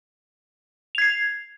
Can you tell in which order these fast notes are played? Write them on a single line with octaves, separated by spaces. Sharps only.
F7 G#6 C7